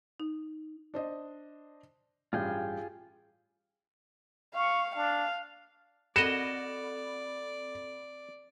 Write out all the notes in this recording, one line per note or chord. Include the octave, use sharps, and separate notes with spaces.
D#4
D4 C5 D#5
A1 G2 F4 G#4 G5
F5 C#6
D4 F5
C4 F#4 A4 D5 D#5 B5 E7